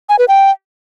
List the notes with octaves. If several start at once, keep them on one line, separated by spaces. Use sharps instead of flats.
G#5
B4
G5